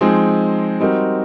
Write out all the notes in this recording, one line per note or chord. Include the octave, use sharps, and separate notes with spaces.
F3 G#3 C4 D#4 G#4
G3 C4 D#4 F#4 A#4